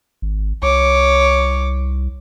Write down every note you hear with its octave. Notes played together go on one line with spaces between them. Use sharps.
G#1
C2 C#5 D6